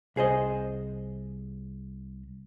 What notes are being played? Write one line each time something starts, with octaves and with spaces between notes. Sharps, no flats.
C2 G#4 C5 D#5